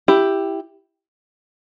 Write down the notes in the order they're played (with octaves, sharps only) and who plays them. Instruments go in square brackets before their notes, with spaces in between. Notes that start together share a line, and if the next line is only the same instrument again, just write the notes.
[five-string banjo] E4 G4